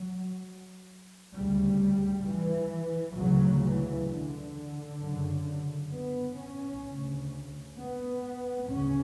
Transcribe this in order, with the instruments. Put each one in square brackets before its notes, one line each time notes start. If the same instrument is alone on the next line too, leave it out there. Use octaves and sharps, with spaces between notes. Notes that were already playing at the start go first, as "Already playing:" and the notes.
Already playing: [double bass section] F#3
D2 C#3 G3
E3
D2 C#3 F#3
E3
D3
F#2 C#3
B3
C#4
C#3
D2
B3
D2 C#3 C#4